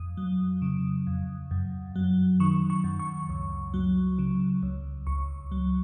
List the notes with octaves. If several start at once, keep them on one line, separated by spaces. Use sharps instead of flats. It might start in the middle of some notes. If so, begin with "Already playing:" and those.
Already playing: F2 D#6
F#3
C#3
F2
F#2
F#3
D#3 C#6
C#6
F#2
C#6
C#2
F#3
C#3
C#2
C#2 C#6
F#3